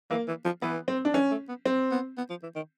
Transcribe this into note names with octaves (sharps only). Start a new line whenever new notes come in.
E3 A#3
E3
F3
E3 B3
C4
D4
E3 C#4
A3
B3
C4
B3
B3
F3
E3
D#3